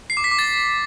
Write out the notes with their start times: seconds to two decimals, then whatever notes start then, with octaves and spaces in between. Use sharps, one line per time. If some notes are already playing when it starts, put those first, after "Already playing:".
0.10 C7
0.17 D6
0.24 B6
0.31 D6
0.39 A6